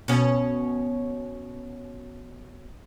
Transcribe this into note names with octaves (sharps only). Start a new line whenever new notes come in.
B2 C#4